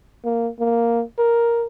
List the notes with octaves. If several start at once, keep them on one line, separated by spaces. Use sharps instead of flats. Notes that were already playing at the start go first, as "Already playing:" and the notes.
A#3
A#3
A#4